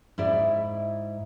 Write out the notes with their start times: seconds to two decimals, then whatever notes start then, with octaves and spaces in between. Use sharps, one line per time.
0.18 G#2 E4 D5